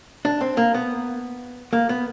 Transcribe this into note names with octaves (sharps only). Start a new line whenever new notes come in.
D4
C4
A#3
B3
A#3
B3